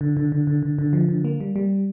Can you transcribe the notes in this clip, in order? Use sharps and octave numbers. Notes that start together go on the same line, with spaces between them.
D3
D3
D3
D3
D3
D3
F3
D3
A#3
G3
G3